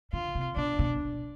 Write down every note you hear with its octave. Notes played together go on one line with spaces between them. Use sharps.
D3 F4
C3
B2 D4
B2